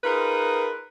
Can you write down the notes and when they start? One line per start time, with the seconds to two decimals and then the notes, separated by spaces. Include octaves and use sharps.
0.04 D#4 F4 G#4 A#4 B4